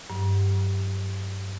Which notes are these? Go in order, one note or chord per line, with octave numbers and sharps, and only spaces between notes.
G2 F#3